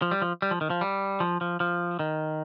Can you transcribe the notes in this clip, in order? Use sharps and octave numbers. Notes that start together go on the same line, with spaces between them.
F3
G3
F3
G3
F3
D#3
F3
G3
F3
F3
F3
D#3